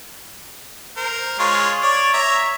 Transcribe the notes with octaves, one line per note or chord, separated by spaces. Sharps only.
A#4 C5
G#3 F4 C#5
C#5 D5
C#5 E5 A#5